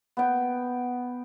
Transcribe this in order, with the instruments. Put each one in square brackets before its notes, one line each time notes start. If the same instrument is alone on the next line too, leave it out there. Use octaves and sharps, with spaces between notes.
[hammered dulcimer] B3 G5